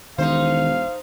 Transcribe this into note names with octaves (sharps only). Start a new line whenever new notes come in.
E1 D#3 D#4 C5 F5